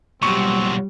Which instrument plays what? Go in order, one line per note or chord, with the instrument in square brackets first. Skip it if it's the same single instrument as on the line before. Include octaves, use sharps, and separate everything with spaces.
[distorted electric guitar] B1 A#2 [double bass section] G3 [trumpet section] C4 F#4 [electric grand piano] C#6